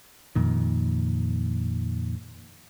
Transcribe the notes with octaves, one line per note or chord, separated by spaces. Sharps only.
F2 A#2 D#3